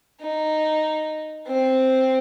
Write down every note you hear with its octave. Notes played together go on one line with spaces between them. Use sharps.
D#4
C4